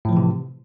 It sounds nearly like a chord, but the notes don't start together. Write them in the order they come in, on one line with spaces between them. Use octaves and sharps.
A2 F3 E3 C3